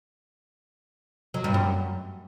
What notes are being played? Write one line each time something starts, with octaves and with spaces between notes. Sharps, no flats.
F#3
G2
F#2